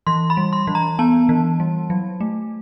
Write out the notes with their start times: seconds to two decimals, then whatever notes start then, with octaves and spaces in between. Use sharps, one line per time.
0.07 E3 C6
0.30 B5
0.37 G3
0.53 C6
0.67 E3
0.75 A#5
0.99 B3 A5
1.29 E3
1.60 G3
1.90 F#3
2.20 A3